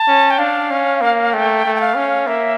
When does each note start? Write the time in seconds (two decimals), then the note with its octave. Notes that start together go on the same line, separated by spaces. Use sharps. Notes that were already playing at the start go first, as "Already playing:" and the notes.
Already playing: A5
0.08 C#4
0.30 G5
0.39 D4 F5
0.71 C#4
1.01 A#3
1.33 A3 G5
1.66 A3
1.75 G5
1.81 F5
1.96 C#4
2.27 A#3 E5